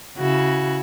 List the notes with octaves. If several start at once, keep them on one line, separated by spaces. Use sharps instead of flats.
C#3 E4 F#4